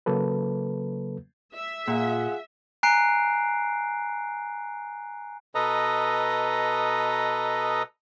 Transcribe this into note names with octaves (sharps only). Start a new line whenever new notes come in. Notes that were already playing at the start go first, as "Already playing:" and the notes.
C#3 F#3 A#3 A4 B4
E5
A#2 F4 G#4 F#5
G#5 A#5 F#6 C7 D7
B2 A4 B4 D#5 A#5 D#6